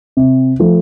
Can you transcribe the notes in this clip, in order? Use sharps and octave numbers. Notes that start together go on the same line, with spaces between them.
C3
F3 A3